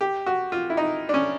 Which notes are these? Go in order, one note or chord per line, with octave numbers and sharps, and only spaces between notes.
G4
F#4
F4
E4
D#4
D4
C#4